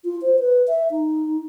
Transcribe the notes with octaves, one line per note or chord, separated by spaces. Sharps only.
F4
C5
B4
E5
D#4